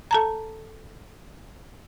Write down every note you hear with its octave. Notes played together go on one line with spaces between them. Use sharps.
A4 A5 A#5